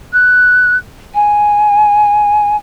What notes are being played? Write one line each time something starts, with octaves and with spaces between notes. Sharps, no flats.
F#6
G#5